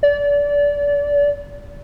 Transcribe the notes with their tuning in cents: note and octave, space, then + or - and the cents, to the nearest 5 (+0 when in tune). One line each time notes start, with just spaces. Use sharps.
D5 -30